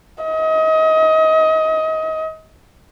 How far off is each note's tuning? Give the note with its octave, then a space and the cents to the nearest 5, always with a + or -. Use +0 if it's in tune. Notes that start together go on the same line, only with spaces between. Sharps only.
D#5 +30